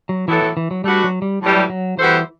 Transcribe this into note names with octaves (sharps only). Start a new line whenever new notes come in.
F#3
A2 E3 F#3 B3 E4 A4
E3
E3
F#3
G3 A3 D4 F#4 B4
F#3
G3
A2 E3 F#3 G3
F#3
E3 G3 B3 F#4 A4 C5